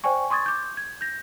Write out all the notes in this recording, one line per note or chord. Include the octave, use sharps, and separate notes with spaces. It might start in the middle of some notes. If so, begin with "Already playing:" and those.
C5 D5 G5 G#5 C#6
C6 C#6 D#6 G#6 A6
D6 G6
G#6
G6 A#6